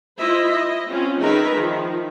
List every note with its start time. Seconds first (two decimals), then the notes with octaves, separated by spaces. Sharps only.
0.20 E4 F4 C5 D#5 E5
0.51 E4 D#5
0.90 C4 C#4 F4
1.21 D#3 D#4 G#4 A#4 B4 E5
1.54 D#3 F3